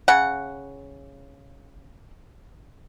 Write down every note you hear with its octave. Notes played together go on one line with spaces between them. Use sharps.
C#3 F#5